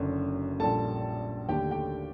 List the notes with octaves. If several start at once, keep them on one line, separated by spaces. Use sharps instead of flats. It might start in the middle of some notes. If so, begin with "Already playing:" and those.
Already playing: F#1 F#2 D3
A#1 A#2 G3 A#3 A4 A5
D#2 D3 A3 G4 G5
G4 G5